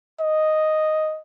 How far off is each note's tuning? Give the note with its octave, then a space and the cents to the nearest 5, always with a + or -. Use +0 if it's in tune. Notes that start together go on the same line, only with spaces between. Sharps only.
D#5 +0